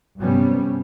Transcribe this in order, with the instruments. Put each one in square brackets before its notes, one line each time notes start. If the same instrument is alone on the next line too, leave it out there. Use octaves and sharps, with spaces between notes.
[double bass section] G2 C3 G3 B3 C#4